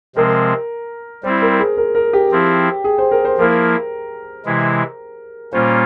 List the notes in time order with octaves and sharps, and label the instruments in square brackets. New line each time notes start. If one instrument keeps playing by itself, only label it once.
[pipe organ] C3 F3 G#3 C4 [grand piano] A#4
[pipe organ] G3 C4 E4 [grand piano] C5
[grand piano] A#4
G#4
A#4
A#4
G4
[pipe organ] F3 C4 E4
[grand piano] G#4
C5
A#4
C5
[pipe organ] F3 A#3 E4 [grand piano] A#4
[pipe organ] C3 E3 G#3 E4
[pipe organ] A#2 G3 A#3 C#4 F4 [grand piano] C5